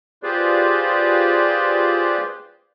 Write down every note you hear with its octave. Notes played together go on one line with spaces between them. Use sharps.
F4 G4 G#4 B4 C5 D5